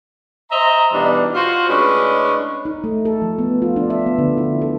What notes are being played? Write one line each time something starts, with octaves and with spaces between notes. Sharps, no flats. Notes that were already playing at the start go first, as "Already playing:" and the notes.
C5 D#5 E5 A#5
B2 E3 G3 B3 D4 D#4
F4 F#4 C5
A2 G#3 C#4 D4 B4
D#4
A3
A4
F3
B3
F4
D4
E5
B3
D3
E4
A4